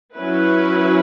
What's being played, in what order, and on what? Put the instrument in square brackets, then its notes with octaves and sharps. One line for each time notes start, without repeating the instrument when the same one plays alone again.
[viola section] F#3 C#4 E4 B4